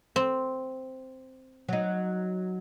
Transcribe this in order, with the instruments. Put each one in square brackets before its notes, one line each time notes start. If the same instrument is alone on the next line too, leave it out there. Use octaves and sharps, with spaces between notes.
[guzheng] C4
[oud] F#3 D#4